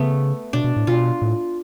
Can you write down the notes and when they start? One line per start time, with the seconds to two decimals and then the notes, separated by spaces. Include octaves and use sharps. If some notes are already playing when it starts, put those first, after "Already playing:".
Already playing: C#3 A3 B3
0.53 B2 D4
0.64 B2
0.76 A2
0.87 B2 F4
1.22 A2